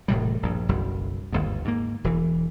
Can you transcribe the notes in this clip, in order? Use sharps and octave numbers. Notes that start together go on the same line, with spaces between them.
E1 A2 C3 G3
A#1 G2
F#1 B1 F#2 G3
G1 D#2 G#2
G#2 D#3 A#3
E1 E3